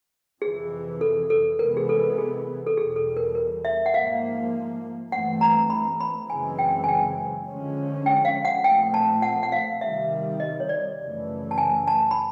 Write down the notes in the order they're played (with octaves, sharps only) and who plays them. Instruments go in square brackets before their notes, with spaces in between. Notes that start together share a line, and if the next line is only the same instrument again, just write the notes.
[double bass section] F2 C3 E3 [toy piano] G#4
[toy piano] A4
A4
[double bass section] C3 E3 G#3 B3 [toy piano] A#4
[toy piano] G#4
A4
A4
G#4
A4
[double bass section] E2 B2 G3 [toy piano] G#4
[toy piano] A4
A#4
A#4
E5
F#5
[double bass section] G#2 F3 A#3 [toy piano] F5
[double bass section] G2 E3 A3 C4 [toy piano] F#5
[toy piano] A#5
B5
B5
[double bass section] F#2 C#3 E3 G#3 C4 [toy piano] G#5
[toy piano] G5
G#5
G5
[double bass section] D3 F3 G#3 C#4
[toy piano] G5
F5
F#5
[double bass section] A#2 F3 A3 C4 [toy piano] G5
[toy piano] A5
F#5
F#5
F5
[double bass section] C3 D#3 G3 [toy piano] E5
[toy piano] D#5
C#5
D5
[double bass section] F#2 C#3 E3 A3
[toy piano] A5
G#5
A5
B5